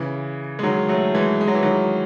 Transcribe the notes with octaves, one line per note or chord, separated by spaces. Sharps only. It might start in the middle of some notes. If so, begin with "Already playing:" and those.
Already playing: C#3 E3
G#3
D#3 F#3
F#3 A3
E3 G#3
G#3
F#3
E3
D#3 F#3